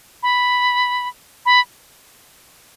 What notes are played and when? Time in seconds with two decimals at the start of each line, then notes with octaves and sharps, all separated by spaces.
0.23 B5
1.46 B5